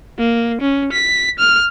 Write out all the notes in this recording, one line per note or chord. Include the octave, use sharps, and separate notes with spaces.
A#3
C#4
B6
F6